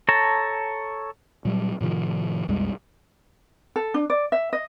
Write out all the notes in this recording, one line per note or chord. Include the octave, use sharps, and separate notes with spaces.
A4 C#5 A5 A#5
A#2 F#3 G3
A2 C3 D#3 F3
B1 F2 G3 G#3
A4
D4
D5
E5
D#5